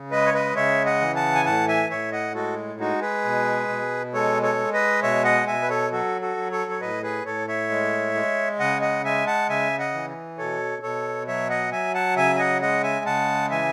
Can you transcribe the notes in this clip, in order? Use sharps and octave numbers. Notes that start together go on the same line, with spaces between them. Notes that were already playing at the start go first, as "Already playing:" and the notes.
Already playing: C#3
G#3 B4 D#5
C#5
B4 D#5
C#3 C#5 E5
D#5 F#5
E3
F#5 A5
G#5
A2 F#5 A5
E5 G#5
A2 C#5 E5
D#5 F#5
G#3 F#4 A4
G#3 D#4 F#4
G#4 B4
B2
B2
G#3 A4 C#5
A4 C#5
G#3
B4 D#5
B2 C#5 E5
D#5 F#5
B2 E5 G#5
B4
A4 C#5
F#3 F#4 A4
F#4 A4
F#3
A4 C#5
C#5
A2 B4 D#5
G#4 B4
A2 A4 C#5
C#5 E5
G#3
G#3
C#3 D#5 F#5
D#5 F#5
G#3 E5 G#5
F#5 A5
C#3 E5 G#5
D#5 F#5
E3
B2 A4 C#5
B2 A4 C#5
F#3 C#5 E5
D#5 F#5
F#3 E5 G#5
F#5 A5
C#3 E5 G#5
G#5
D#5 F#5
G#3 D#5 F#5
E5 G#5
C#3 F#5 A5
E3 E5 G#5